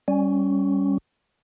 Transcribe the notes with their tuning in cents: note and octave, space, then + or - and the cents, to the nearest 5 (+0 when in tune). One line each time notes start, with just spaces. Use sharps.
G3 +0 C#4 +0